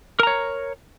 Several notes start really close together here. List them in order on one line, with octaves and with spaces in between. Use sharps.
A#4 A#5 C#5